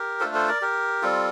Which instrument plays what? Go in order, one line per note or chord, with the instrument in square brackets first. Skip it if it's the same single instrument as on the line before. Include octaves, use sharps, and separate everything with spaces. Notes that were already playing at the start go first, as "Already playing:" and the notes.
Already playing: [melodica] G4 A#4
A3 D4 F4 A4 C5
A4 C5
A#4 D5
G4 A#4
G3 C4 F4 A4